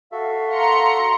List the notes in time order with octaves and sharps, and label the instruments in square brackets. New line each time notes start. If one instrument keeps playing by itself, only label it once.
[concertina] F#4 A4 E5 [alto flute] F5
[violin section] A#5 C6 C#7